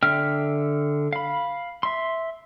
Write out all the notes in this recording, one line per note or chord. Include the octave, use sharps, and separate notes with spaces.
D3 E5 G5 F6
F5 B5
E5 C6